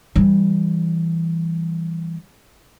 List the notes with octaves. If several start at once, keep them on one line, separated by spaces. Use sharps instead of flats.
E3 G3